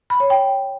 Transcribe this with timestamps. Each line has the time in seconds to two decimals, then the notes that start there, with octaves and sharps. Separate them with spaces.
0.10 B5
0.20 C#5
0.30 G5